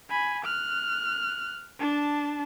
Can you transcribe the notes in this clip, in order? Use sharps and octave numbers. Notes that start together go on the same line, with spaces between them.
G#5 B5
F6 F#6
D4 A5